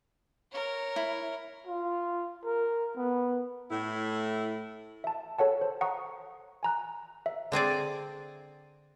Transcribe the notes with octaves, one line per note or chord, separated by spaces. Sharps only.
A#4 C#5
E4
F4
A#4
B3
A2 E4
E5 A5
A4 C#5 F#5 A5
C5
F#5 A#5 C#6 D#6
G#5 A#5 F#6
E5
D3 C4 G#4 D5